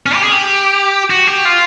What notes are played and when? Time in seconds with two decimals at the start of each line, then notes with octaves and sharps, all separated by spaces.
0.06 C#4
0.15 G4
0.23 G#4
0.32 G4
1.10 F#4
1.27 G4
1.45 F4